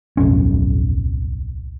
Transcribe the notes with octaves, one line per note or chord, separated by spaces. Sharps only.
D1 B1 F2 C#4